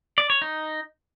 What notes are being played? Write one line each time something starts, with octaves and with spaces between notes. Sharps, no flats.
D5
C#5
D#4